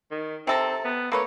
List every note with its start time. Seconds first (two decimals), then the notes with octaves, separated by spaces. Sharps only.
0.11 D#3
0.47 C3 C4 A4 A#5
0.85 B3
1.12 A3 A#3 B4 C#5